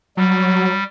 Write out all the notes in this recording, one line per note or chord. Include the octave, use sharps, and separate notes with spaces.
F#3 G3